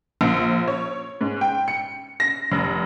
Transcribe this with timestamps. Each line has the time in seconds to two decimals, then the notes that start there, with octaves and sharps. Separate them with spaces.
0.21 A#1
0.68 C#5
1.21 G#2
1.41 G5
1.68 C#7
2.20 A#6
2.52 F1